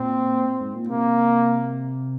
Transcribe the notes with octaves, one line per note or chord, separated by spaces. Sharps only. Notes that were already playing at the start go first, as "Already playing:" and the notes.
Already playing: A#2 C4
G#2
A#2
C3 A#3